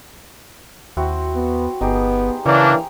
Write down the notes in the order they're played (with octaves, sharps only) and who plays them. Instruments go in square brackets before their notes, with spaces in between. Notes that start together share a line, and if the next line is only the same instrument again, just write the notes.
[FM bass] D#2 [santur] C4 E4 F#4
[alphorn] B3
[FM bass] G1 [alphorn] B3 [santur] D#4 G4 G#4
[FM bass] C#3 [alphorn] E3 [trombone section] A#3 C#4 D4 [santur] A#5